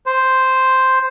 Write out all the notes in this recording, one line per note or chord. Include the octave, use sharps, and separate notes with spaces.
C5